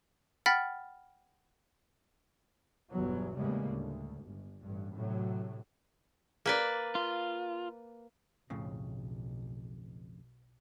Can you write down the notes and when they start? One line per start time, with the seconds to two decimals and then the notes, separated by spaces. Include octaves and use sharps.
0.46 F#5 G5 B5 F6 A6 B6
2.91 G1 E2 B2 F#3
3.37 E2 A2 C#3 G3 G#3 A#3
3.70 D2
4.25 G1
4.62 A1 G2
4.96 A2 C3 F#3
6.46 A#3 B4 D5
6.95 F4
8.50 B1 F2 A2 C#3